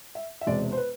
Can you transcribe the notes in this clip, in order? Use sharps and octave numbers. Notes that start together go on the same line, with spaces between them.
E5
E5
E1 E2 C3 G#3 D5
C5
B4